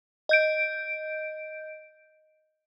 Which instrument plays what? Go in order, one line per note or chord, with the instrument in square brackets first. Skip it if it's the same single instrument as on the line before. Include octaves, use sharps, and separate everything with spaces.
[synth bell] D#5 G6 D7